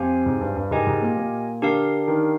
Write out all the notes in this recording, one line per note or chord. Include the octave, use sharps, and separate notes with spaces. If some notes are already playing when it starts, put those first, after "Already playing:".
Already playing: F2 G4 C5 F5 G#5
G#2
G2
G2
G#2 G4 A#4 D#5 G#5
G#2
A#2
A#2
D3 D4 G4 A#4 F5
D#3